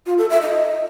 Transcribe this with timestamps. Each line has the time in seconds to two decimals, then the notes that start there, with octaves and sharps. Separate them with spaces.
0.06 F4
0.18 A4
0.30 E5
0.42 D#5